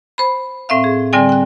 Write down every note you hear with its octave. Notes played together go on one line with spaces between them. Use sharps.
C5 B5
A2 C4 E5 F5
G#4
D3 G3 C4 D5 G5 G#5
G5 F#6